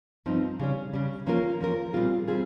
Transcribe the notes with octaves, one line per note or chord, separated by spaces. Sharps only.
G2 F3 C4 D#4
C#3 G3 C#4
C#3 G3 C#4
F3 A#3 C#4 F4 A#4
F3 A#3 C#4 F4 A#4
A#2 G3 C4 F4 G#4
G3 C4 F4 G#4